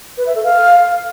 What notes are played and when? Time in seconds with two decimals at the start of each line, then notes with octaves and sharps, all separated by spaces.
0.18 B4
0.26 E5
0.35 A4
0.44 F5